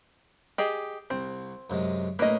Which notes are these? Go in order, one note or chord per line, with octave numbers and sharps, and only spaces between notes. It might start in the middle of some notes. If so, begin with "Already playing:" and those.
G4 G#4 D#5
C2 C4
F#2 C3 G#3
A2 A#3 C#4 B4 D#5